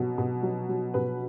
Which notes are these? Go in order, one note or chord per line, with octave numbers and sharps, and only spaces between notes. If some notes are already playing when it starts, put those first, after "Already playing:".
Already playing: B2 F#3
B2
F#3
F#3
B2 B4